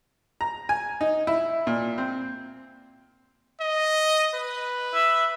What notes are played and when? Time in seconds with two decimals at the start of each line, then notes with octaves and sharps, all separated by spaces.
0.41 A#5
0.69 G#5
1.01 D#4
1.27 E4
1.67 A#2
1.98 C4
3.61 D#5
4.35 B4
4.94 E5